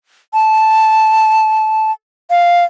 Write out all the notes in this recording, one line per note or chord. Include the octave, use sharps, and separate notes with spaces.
A5
F5